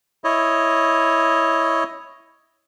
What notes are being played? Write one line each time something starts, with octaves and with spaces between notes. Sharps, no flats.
E4 C#5 D#5